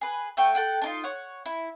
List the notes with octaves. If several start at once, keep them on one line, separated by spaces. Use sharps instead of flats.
G#4 B4
A3 F#5 G5 C#6
A4 F#5 G5
D4 D#4 F4
C#5 F#5
E4